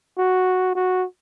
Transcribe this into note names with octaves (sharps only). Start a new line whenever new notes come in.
F#4
F#4